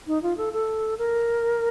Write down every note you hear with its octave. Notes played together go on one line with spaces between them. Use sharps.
D#4
F4
A4
A4
A#4